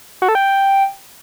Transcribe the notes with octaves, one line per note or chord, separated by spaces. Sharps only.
F#4
A4
G5